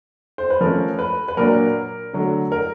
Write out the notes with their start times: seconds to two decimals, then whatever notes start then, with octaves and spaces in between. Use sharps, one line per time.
0.38 C5
0.50 B4
0.61 F3 A3 C#4 A#4
0.99 B4
1.28 B4
1.37 A#2 F#3 A#3 D4 A#4
2.13 D3 F#3 A3
2.52 A#4